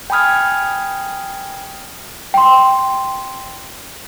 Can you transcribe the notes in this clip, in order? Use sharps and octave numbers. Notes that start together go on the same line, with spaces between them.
G5 G#5 B5 D#6 F6 G#6
G5 C6